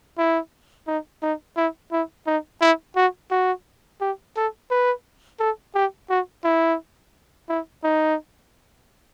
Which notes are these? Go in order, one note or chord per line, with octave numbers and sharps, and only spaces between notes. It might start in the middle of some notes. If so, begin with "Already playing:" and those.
E4
D#4
D#4
E4
E4
D#4
E4
F#4
F#4
G4
A4
B4
A4
G4
F#4
E4
E4
D#4